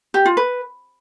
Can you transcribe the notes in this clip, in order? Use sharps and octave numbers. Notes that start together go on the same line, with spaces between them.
G4
F4
B4